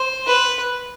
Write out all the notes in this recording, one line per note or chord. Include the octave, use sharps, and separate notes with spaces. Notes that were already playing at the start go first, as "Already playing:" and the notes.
Already playing: C5
B4